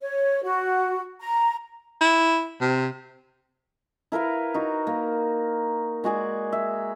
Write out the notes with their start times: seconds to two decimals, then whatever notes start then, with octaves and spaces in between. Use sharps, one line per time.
0.01 C#5
0.44 F#4
1.21 A#5
2.01 E4
2.61 C3
4.12 E4 A#4 B4 F5
4.54 D#4 F#4
4.87 A#3
6.04 G#3 F#4 G#4 D5
6.52 E5